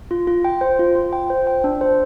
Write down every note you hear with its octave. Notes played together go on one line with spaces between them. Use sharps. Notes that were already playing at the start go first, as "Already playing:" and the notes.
F4
F4
G5
C5
F4
F4
G5
C5
G5
D4
C5